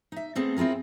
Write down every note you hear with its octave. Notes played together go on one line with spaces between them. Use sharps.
D#4 E5
A3 B3 C4 G#4 A4
C4 E4 F4 G#4 A#4